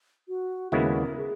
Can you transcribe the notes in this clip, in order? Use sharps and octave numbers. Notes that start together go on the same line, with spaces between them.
F#4
D#2 C#3 G#3 B3 E4 A#4
G#4